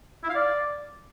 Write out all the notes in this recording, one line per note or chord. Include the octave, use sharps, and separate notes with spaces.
E4
F5
D5